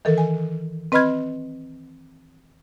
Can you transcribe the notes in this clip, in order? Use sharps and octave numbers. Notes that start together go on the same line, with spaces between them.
D#3 E3 A4 A#4
G#5
C4 B4 D#5 B5 F6 G#6